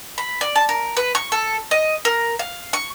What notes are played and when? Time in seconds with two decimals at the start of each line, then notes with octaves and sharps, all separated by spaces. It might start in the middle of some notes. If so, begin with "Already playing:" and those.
0.18 B5
0.41 D5
0.56 A5
0.69 A#4
0.97 B4
1.15 C#6
1.32 A4
1.71 D#5
2.05 A#4
2.39 F5
2.73 C#6